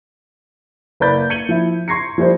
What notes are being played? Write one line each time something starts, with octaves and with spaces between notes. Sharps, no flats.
F#1 B4 D5 B5 G6 A6
G#6 C#7 D#7 F#7 G7
F3 E4
C6 C#6 G#6 A#6 C7 C#7
F3 G3 E4 C5